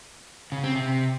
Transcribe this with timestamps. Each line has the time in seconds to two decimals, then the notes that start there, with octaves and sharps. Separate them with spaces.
0.52 C#3
0.64 C4
0.75 C3